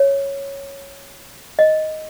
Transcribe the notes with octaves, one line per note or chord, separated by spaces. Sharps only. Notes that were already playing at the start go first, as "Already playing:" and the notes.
Already playing: C#5
D#5